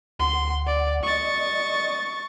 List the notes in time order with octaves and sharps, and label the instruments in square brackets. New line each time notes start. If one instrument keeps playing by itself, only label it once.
[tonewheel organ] D2 F#5 [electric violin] C6
[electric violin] D5
[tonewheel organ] D5 D#5 D#6 [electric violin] C#6 A6